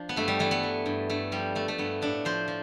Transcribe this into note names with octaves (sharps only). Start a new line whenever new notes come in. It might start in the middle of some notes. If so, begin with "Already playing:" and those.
Already playing: F3 D4
B3
G2 A3
G3
E3 A3
B3
E3
G2
G2 A3
F3 G3
F3 A3
A3
G2 B3
A2 D4
F3 C5
F3